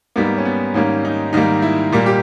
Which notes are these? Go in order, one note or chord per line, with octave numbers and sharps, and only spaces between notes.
G#2 G3 A#3 B3
C#4
B3
G#2 D#3 G3 A#3 C#4
D#4
G#2 D#3 G3 A#3 D#4
E4
A#2 G3 A#3
G4